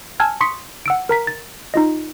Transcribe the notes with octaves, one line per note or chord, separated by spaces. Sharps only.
G#5 A5 E6 F6 G#6
C6 C#6 D#6 B6 C#7
F#5 E6 D7
A#4 A#5 B6
A6
D#4 F4 D#5